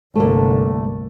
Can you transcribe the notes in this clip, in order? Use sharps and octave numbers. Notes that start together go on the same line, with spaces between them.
G1 C2 D3 A3 A#3